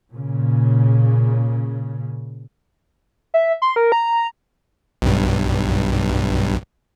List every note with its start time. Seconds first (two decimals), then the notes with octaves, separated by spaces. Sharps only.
0.13 A#2 C#3
3.34 E5
3.62 C6
3.76 A#4
3.92 A#5
5.02 B1 G2